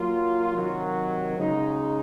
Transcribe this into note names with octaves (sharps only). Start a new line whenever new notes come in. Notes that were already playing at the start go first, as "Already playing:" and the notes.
Already playing: F#3 A#3 F4
C3 D#3 F#3
C#3 G#3 D#4